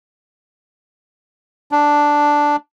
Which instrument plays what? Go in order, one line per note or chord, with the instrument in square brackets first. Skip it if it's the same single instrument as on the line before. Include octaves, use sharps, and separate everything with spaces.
[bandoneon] D4